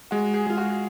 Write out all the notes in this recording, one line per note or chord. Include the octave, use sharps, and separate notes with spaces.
G#3 F#4
G#4
G#3 F4
F#4